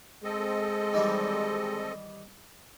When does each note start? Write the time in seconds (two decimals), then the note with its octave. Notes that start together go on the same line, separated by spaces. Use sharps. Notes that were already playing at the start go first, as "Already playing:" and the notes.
0.24 G#3 C4 A4 D#5
0.94 D#3 E3 G3